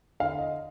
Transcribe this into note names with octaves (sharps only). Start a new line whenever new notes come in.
D3 F5
D#5